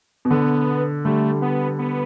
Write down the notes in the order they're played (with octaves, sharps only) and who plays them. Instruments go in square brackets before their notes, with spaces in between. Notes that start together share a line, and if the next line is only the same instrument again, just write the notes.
[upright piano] B2
[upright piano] D3 [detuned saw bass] B3
[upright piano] D3 G3 [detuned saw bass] A3
[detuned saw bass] B3
B3